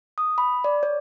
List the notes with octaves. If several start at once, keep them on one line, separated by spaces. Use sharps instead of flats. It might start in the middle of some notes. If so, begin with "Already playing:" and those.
D#6
B5
D5
C#5